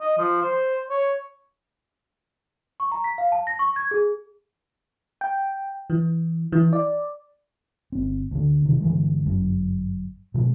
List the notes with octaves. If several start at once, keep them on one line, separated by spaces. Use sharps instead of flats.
D#5
F3
C5
C#5
C#6
A#5
B6
F5
A5
A#6
C#6
G#6
G#4
G5
E3
E3
D5
G1 C4
D2 D3
E1 C3 D#3
G2 D3 E3 G#3
G1 F#2
B2 F3 G#3